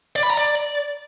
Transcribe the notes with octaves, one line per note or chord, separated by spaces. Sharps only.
D5
B5
A#5
D5